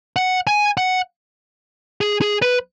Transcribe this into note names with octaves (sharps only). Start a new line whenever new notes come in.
F#5
G#5
F#5
G#4
G#4
B4